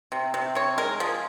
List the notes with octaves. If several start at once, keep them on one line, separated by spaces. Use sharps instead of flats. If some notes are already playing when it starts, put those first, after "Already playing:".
C3
C3
C3 C#5
G#3 A#4
F3 G#4